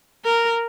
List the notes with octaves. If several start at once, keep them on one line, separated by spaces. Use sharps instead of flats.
A#4